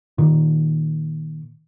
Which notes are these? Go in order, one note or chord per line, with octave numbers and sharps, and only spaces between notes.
A#2 D#3